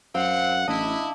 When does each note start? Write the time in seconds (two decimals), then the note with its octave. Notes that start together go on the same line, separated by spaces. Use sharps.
0.15 F#2 C4 F5 F#5
0.68 A1 D4 E4 D#5